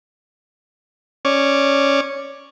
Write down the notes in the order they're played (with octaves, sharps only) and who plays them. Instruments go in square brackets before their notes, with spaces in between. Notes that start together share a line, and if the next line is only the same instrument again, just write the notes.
[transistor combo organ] C#4 C#5 D5